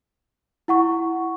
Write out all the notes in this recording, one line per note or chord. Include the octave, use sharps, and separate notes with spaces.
E4 F#5 C#6